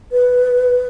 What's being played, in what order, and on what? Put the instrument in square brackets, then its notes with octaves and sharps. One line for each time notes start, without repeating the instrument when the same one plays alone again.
[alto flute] B4